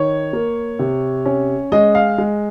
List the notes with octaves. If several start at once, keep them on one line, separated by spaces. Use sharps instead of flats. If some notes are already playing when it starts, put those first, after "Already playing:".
Already playing: D#3 C#5
A#3
C3
C#4
G#3 D#5
F5
G#3